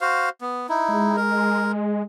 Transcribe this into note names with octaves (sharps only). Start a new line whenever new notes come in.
F#4 C5 F5
B3
D#4 E4
G#3
A#4